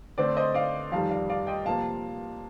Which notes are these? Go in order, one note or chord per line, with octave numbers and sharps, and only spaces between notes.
D3 A3 C4 D5
C5 D#5
D5 F5
F2 D#3 G3 F5 A5
D5 F5
D5 F5
D#5 G5
C3 F3 A#3 F5 A5